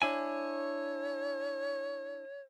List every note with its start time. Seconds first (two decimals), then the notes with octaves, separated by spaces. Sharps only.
0.02 D4 E4 C#5 G#5